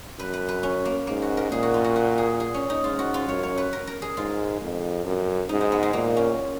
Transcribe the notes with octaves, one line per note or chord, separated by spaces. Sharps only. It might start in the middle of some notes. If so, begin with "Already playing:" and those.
F#2 B4
B4
B4
C#4
A#3
G#2 A#3
F#4
A#4
A#2 G#4
F#4
F4
F#4
F#4
G#4
G#4
C#4
D#4
G#2 F4
F#4
F4
F#2 C#5
C#5
B4
A#4
A#4
G#4
G#2 F4
F2
F#2
G#2 D#4
D#4
B3
G#3
A#2 A#3
C#4